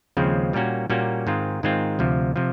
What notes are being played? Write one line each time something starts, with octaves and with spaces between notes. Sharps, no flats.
D#2 C#3 F3 G#3 C4
A#2 G3 A#3 C#4 F#4
A#2 G3 A#3 C#4 F#4
G#2 D#3 G#3 C4 F4
G#2 D#3 G#3 C4 F4
D2 C3 F3
C3 F3